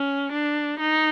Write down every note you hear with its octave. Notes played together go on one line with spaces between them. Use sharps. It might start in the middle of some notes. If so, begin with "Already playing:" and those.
Already playing: C#4
D4
D#4